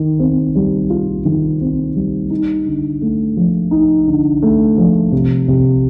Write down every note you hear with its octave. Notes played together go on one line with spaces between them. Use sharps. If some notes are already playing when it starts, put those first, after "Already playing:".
Already playing: D#3
C4
G3
F4
D#3
C4
G3
D#4
D3
A3
F3
D#4
D3
A3
F3
C3
C3